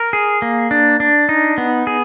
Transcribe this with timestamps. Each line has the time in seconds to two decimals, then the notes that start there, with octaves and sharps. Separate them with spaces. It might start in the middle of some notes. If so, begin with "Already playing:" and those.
Already playing: A#4
0.13 G#4
0.42 A#3
0.71 D4
1.00 D4
1.29 D#4
1.58 B3
1.87 G#4